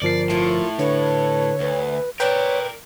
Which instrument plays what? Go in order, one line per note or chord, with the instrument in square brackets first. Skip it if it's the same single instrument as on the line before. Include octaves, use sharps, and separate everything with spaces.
[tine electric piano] G1 F3 C7 [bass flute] A#4 [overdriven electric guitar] D5
[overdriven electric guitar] A2 [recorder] F4
[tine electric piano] D3 [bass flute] B4 [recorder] C#5
[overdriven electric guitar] D2 [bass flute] B4
[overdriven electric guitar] A#4 D5 [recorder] B4 [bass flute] C#5 [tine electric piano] G5